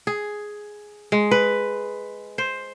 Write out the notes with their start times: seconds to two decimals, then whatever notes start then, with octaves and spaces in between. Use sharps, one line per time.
0.07 G#4
1.12 G#3
1.31 B4
2.38 C5